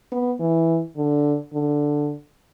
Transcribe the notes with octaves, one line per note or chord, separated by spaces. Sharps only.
B3
E3
D3
D3